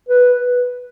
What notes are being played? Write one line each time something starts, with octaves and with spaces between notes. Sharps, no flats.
B4